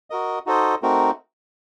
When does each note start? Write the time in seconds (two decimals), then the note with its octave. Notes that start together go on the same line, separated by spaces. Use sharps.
0.10 F#4 A#4 D#5
0.46 D#4 F#4 A4 C5 D#5
0.82 A3 C4 D#4 F#4 A#4